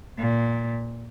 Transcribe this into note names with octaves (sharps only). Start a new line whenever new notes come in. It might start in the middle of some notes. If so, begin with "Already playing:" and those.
A#2